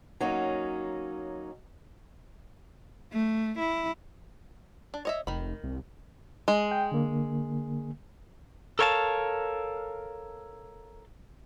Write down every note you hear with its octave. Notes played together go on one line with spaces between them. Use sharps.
F#3 A#3 C#4 D#4
A3
E4
D4
C#5 D#5 E5
F1 D#3 B5
C2
G#3
G5
D3 A#3
A4 A#4 C#5 F5 G#5 A5